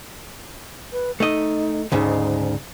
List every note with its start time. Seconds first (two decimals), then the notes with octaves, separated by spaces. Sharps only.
0.92 B4
1.20 A3 D#4 D#5
1.92 D2 G#2 C#3 D#4